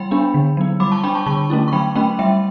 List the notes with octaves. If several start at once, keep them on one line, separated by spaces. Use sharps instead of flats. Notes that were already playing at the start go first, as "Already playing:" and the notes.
Already playing: G3 G5 B5
B3 D4
D3
F#3 B3
G3 B5 D6
A5 C#6
D4 G5 B5
A5 C#6
D3 A5 C#6
A3 C#4 E4
C#6
F#3 G5 B5
A3 C#4 G5 B5
G3 E5 G5